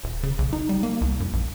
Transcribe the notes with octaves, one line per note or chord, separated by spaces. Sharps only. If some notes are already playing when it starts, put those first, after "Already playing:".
D#1
C#3
B1
D#4
G3
A#3
C2
F#2
A#1